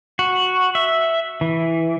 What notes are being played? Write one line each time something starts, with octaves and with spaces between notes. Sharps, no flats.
F#4
E5
E3